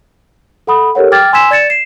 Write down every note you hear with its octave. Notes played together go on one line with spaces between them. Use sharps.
A4 F#5 B5 D#6
G4 A4 A#4 C#5 F#5
G5 D6 F6 G#6 A6
G#5 C6 E6 G#6 B6 E7
D5 G#6 A6 C#7 E7
C7 E7